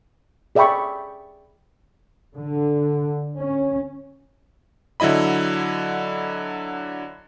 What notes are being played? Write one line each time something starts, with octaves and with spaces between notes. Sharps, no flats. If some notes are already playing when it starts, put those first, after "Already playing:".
G#4 D5 E5 G5 B5 C#6
D3
C#4
D3 F#3 E4 D#5 B5